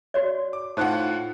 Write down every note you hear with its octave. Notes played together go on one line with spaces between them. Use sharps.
F#4 C#5 D5
D6
A2 D#4 F4 C5 F#5 A5